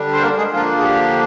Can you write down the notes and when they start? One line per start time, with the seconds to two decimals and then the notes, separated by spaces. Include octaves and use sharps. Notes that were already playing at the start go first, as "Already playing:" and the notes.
Already playing: D3 G3 D4
0.13 C5
0.22 A#3 A#4
0.37 G#3 G#4
0.53 D3 F3 A#3 D4 F4
0.78 G#4
0.83 G4